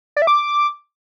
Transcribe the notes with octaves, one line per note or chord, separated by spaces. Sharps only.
D5
E5
D6